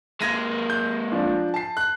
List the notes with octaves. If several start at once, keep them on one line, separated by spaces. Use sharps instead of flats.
G#3 A#3 G#6 A#6 D#7
G6
F3 D4
A5 C7
F#6